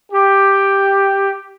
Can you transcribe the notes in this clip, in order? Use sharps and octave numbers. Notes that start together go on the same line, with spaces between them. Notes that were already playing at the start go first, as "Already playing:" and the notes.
G4